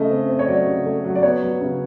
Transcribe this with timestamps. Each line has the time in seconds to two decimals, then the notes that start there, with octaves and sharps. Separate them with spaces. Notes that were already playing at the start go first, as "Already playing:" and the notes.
Already playing: C#3 A3 D#5
0.10 C4
0.29 C4
0.39 C#5
0.48 F#3 D5
0.67 C#3
0.86 A3
1.05 F#3
1.15 D5
1.23 B3 C#5
1.42 F#3
1.61 C#3